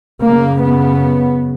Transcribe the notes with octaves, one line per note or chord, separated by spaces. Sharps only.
F#2 C#3 A#3
B3